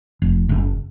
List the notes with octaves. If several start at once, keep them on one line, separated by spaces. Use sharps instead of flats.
F1
F#1